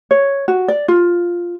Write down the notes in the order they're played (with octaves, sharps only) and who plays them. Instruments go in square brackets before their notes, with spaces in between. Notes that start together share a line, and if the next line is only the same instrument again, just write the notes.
[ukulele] C#5
F#4
D5
F4